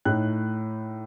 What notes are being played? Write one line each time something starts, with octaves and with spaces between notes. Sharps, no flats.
A2 A3 D#4 F#6